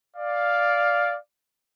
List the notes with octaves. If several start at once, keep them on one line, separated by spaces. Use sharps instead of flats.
D5 F5